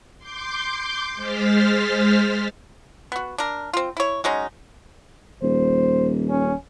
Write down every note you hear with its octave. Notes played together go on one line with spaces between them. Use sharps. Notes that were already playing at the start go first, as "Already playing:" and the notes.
C6 D6 G6
G#3 C5 F6 A6 B6
B3 F#4
D4 A#4
C4 F4
E4 C#5
F#3 G#3 C#4 D#4
D#1 C5
C#4